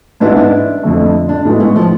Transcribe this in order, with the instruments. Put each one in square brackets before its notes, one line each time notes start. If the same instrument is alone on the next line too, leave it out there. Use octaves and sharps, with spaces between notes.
[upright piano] G#2 E3 B3 E4 B4 [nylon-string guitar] D4
[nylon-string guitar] D4
[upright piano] F2 D3 A3
[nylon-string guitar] D4
[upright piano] A2 E3 G#3 B3
[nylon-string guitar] A3
F3